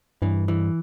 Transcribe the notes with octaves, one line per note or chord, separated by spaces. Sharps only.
G2 E3
E3